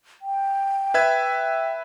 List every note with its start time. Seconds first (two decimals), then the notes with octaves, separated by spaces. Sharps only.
0.22 G5
0.94 B4 E5 G#6